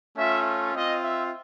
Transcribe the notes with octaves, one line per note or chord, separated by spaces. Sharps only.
A3 C#4 F4 E5
C4 F4 D#5
E5